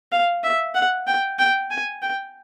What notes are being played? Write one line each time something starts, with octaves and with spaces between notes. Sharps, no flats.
F5
E5
F#5
G5
G5
G#5
G5